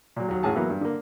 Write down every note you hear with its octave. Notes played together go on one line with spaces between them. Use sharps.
A#2 F#3
D#2 F#3
A1 F#2 A2 G#4 A5
E3 F#3 A#3 B3 E4
G2
D3 A#3